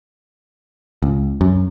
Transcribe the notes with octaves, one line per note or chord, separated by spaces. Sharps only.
C#2
F#2